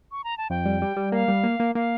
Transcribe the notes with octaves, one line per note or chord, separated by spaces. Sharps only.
C#6
A#5
A5
F2 G5
G3
G3
G3
A#3 F5
G3
A#3
A#3
A#3 F5